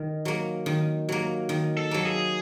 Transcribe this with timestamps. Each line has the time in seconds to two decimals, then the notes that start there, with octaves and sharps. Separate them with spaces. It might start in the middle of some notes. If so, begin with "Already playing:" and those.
Already playing: D#3
0.25 F#3 A#3
0.66 D#3
1.09 F#3 A#3
1.49 D#3
1.77 A4
1.91 F#3 A#3
2.05 G#4